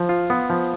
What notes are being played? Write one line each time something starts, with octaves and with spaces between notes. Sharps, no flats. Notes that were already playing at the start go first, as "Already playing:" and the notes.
Already playing: F3
F4
B3
F3